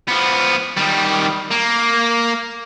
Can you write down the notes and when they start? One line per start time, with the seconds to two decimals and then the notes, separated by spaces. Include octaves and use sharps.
0.08 F3 B3
0.77 D#3 G3
1.51 A#3